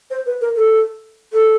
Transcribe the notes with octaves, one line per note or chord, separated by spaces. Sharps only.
C5
B4
A#4
A4
A4